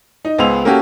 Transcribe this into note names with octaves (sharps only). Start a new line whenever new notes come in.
D#4
C#2 B3 G#4 C5 E6 F7
A#3 C#4 F#4 G4 A4